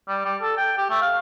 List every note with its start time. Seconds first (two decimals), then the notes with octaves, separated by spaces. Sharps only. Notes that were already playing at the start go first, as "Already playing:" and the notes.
0.08 G3
0.25 G3
0.42 A4
0.57 G5
0.78 G4
0.90 A3
1.02 F5